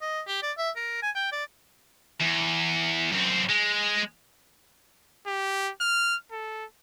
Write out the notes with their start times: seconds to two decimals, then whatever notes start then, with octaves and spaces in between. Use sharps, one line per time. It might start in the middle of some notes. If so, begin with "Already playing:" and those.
0.01 D#5
0.27 G4
0.43 D5
0.58 E5
0.76 A#4
1.02 G#5
1.16 G5
1.32 D5
2.21 E2
3.12 F#2 C4
3.49 G#3
5.27 G4
5.81 F6
6.31 A4